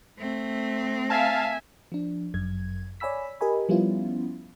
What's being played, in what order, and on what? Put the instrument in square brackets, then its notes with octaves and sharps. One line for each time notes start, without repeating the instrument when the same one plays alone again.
[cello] A3 C4
[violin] E5 G#5 [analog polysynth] F5 A5
[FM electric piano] F3 D4
G1 F#2 G#6
C#5 D5 G#5 B5 E6 B6
G4 A#4 D#5 G#5 B5
F3 G3 B3 C#4 E4 F4